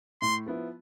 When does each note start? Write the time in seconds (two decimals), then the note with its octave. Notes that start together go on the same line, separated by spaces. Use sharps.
0.22 A2 C6
0.46 F3 B3 E4